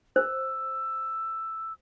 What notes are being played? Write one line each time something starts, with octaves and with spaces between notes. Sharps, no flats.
C5 E6